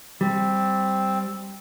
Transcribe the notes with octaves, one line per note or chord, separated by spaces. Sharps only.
G3 C4